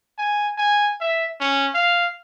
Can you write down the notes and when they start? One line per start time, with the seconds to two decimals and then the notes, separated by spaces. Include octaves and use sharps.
0.18 G#5
0.58 G#5
1.01 E5
1.40 C#4
1.75 F5